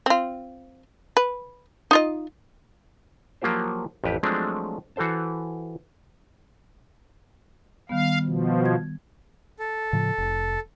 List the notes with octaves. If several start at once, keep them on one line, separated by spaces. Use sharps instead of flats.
C4 F4
B4
D#4 F4 D#5
F3 F#3 A#3 F4 G4 C5
A1 F2 G4 B4
F3 F#3 G#3 A3 C4 D4
E3 F#4 A4 C5 A5
D#3 G3 B3 F5
B2 F3
G#6
A4
A2 C#3 F3
F1